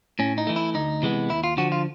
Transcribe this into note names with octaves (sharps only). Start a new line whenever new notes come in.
A2 C#4
D#4
E3 A3
E4
D2 D#4
C3 E3 G#3 B3
D#2 E4
F4
D3 F3 F#4
F4